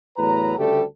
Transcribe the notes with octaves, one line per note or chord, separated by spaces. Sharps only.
E2 A2 F#3 B4 A#5
D2 C#3 G3 A3 G4 A4